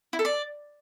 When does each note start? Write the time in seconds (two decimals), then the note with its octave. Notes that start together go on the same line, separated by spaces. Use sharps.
0.13 E4
0.19 A4
0.25 D5